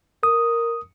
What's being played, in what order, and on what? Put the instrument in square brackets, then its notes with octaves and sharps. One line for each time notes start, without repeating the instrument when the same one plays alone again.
[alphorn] A#4 [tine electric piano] D#6